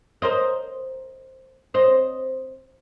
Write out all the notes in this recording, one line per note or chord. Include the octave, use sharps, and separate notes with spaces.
A#4 C5 D#5
C5 D#5